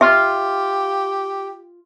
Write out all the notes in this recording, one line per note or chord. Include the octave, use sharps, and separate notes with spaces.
F4 G4 E5